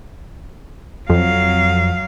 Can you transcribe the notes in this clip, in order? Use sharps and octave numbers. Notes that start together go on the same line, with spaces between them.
F2 F#3 F5